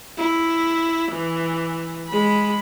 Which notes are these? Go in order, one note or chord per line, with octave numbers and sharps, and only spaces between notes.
E4
E3
G#3 B5